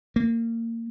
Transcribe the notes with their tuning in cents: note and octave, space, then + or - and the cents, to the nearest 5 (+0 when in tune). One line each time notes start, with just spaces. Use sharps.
A#3 -25